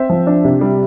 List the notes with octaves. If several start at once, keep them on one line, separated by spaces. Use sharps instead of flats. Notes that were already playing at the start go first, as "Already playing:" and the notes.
Already playing: C4 E5
F3
D4
C3
G3